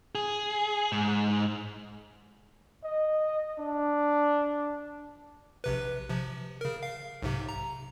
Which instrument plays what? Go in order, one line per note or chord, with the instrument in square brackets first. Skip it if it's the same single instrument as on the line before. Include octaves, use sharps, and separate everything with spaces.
[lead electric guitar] G#4
G#2
[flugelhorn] D#5
D4
[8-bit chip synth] A#1 C3 B4
C3 F3
C#3 A#4
F5
B1 G#2 C3
A#5